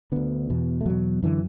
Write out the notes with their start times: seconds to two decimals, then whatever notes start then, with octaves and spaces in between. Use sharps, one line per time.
0.12 D2 D3 B3
0.50 E2 B2
0.81 A3
0.86 E2 B2 F#3
1.23 F#2 D3 E3